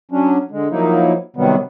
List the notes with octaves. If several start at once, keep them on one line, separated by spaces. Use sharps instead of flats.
F#3 C#4 D4
D3 G#3
F3 F#3 A#3 D#4 E4
C3 D#3 F#3 G3 B3